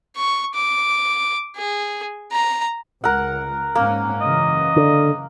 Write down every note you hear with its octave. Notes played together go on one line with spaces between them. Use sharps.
C#6
D6
G#4
A#5
C#2 A#4 F#5
G#2 A#3 C#4
F#1 C#3 E3 D#5
D3